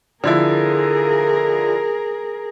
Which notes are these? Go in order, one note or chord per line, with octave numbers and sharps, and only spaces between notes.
D3 F3 E4 G#4 A#4